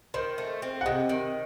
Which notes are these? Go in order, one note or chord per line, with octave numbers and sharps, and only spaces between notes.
D#3 C5
A3
C4
F#5
C3 D#5
D#3